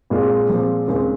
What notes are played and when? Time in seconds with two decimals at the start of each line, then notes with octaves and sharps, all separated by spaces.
0.10 A#1 A#2 G#3 C4 F4
0.49 A#2 F3 G#3 C4
0.88 D#2 C#3 G#3 C4